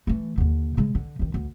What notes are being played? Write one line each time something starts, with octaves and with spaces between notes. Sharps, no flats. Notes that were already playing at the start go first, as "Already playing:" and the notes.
E3 A3
D#2 D3
C#3 G#3
D3
F#2 D#3
D2